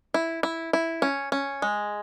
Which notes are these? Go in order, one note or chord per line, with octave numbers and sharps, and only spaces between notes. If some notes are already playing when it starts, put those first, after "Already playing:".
E4
E4
E4
C#4
C#4
G#3